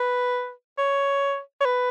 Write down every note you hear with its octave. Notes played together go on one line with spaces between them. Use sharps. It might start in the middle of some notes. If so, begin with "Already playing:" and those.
Already playing: B4
C#5
C#5
B4